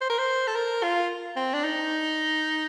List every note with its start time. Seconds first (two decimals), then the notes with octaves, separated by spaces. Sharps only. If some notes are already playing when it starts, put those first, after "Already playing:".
0.01 C5
0.10 A#4
0.18 C5
0.47 A4
0.55 A#4
0.83 F4
1.36 C4
1.53 D4
1.64 D#4